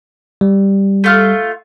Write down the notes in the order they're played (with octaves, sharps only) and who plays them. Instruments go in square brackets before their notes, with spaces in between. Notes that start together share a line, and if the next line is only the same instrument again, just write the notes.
[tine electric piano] G3
[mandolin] A3 F4 F6